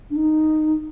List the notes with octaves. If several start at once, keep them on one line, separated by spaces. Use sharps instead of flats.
D4
D#4